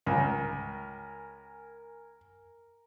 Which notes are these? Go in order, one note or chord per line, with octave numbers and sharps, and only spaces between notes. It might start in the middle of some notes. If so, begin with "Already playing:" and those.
C#2 A#4 G#5